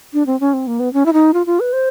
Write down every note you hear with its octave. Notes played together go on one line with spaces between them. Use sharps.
D4
C4
C#4
C4
A#3
B3
C#4
E4
D#4
F4
F4
B4
C5